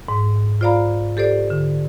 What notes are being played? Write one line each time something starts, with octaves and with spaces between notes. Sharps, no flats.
G#2
F4 C5 D5 F5 A#5 B5
G4 A4 C5 D5
D3